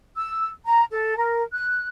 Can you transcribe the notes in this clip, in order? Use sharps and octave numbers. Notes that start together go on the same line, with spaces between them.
E6
A#5
A4
A#4
F#6